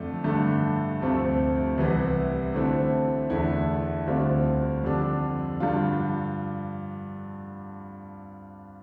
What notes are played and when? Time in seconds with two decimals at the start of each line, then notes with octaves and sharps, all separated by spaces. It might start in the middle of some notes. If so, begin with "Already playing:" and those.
Already playing: F2 D3 A3 D4
0.24 G2 D3 A3 D4
1.01 D2 C3 F3 A3 C4
1.77 C2 C3 E3 B3 E4
2.54 D3 A3 C4 E4
3.30 E2 D3 A3 E4
4.07 D2 D3 G3 C4 F4
4.83 F2 D3 G3 D4
5.60 G2 D3 G3 D4 F4